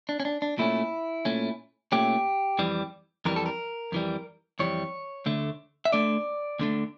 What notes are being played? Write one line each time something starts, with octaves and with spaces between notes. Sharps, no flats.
D4
C#4
D4
D4
A#2 A3 C#4 E4
A#2 A3 C#4
A#2 A3 C#4 G4
F2 E3 G3
F2 E3 G3 A#4
A4
A#4
F2 E3 G3
F2 E3 G3 C#5
D2 D3 A3
E5
D2 D3 A3 D5
D2 D3 A3